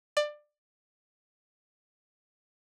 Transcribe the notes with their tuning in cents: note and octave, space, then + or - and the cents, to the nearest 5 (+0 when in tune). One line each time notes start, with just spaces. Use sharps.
D5 +20